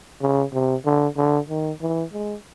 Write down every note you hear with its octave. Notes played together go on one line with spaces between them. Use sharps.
C#3
C3
D3
D3
D#3
E3
G#3